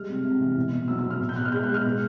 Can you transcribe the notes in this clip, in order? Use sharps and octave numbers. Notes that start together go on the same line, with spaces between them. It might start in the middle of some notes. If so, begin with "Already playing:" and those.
Already playing: G3 G#3 F6
C3
C3
E3
B2
B2
F#3 E6
E6
F#3
F6
B2
G6
B2 F#6
F6
G#3 G6
F#6
G#3
F6
B2